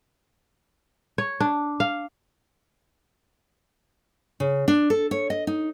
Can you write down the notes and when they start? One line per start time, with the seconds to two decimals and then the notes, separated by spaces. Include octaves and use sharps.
1.18 C#5
1.40 D4
1.80 F5
4.40 C#3
4.68 D4
4.90 A4
5.11 C#5
5.30 D#5
5.47 D#4